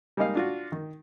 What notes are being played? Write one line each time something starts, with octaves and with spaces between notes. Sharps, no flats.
G3 G#3 A#3 D#4 D#5 F5
D4 F4 F#4
D#3